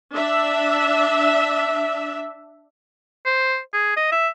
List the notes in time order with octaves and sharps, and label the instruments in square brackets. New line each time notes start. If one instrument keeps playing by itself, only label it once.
[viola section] D4 E5
[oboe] C5
G#4
D#5
E5